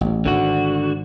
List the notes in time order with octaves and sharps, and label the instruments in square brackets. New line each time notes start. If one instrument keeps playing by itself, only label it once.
[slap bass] A1
[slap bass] G#1 [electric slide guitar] D3 F#4